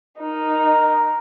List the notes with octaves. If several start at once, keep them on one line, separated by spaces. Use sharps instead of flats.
D#4 A#4